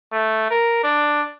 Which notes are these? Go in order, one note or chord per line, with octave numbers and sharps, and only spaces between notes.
A3
A#4
D4